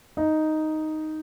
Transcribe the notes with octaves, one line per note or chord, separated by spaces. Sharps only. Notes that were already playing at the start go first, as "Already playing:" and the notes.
D#4